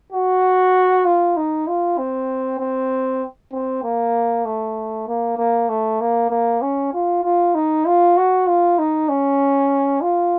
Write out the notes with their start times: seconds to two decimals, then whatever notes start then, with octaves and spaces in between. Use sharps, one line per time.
0.13 F#4
1.05 F4
1.37 D#4
1.68 F4
1.98 C4
2.59 C4
3.53 C4
3.83 A#3
4.45 A3
5.08 A#3
5.38 A#3
5.69 A3
6.01 A#3
6.30 A#3
6.62 C#4
6.93 F4
7.24 F4
7.55 D#4
7.86 F4
8.17 F#4
8.47 F4
8.79 D#4
9.09 C#4
10.01 F4